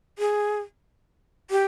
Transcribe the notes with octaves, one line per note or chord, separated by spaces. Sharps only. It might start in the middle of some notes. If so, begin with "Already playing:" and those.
G#4
G4